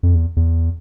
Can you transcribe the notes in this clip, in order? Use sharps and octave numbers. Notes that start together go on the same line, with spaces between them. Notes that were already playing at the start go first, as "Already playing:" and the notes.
F2
E2
E2